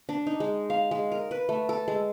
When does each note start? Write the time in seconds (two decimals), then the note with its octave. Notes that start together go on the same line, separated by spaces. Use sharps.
0.09 D4
0.27 D#4
0.40 G#3
0.70 F5
0.91 G#3
1.12 A#4
1.31 B4
1.49 A3
1.69 A4
1.88 G#3